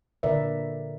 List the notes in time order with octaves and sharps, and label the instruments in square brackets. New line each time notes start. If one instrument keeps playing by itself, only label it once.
[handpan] A#2 D3 A#4 B4 D5 E5